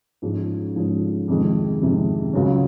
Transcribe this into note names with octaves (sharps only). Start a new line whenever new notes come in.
G#2 F3 G#3 C#4
G#2 F3 G#3 C#4
F2 C3 D#3 G#3
F2 C3 D#3 G#3
C#2 C#3 F#3 C#4